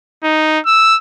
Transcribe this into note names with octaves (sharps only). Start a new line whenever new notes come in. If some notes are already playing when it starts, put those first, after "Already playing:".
D#4
E6